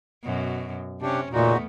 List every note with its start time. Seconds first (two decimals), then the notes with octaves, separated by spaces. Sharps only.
0.23 F#2 B2
1.02 C3 C#4 D4 G4
1.33 E2 A#2 C#3 A3 B3 D#4 F#4